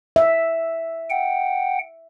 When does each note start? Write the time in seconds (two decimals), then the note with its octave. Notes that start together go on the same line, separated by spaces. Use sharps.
0.16 E5
1.10 F#5 G5